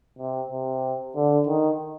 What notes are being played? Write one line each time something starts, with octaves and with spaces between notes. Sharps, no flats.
C3
C3
D3
D#3